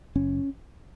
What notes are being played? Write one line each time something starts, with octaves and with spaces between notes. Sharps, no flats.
F#1 C#4